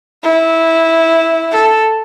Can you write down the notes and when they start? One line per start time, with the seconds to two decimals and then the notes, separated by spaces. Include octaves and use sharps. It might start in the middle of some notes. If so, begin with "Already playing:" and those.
0.23 E4
1.52 A4